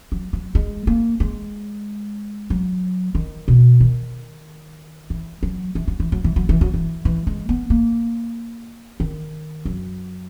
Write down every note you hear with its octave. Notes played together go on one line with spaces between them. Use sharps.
F#3
F#3
G#3
A#3
G#3
F#3
D#3
B2
D#3
E3
F#3
E3
F#3
E3
F#3
E3
F#3
E3
F#3
E3
E3
G#3
B3
A#3
D#3
F#2